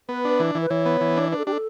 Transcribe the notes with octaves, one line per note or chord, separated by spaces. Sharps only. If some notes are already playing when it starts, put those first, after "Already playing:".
B3 B4
D4 B4
E3
E3
B4
E3 C#5
B3
E3
D4
D4 B4
A4
D4 G4
A4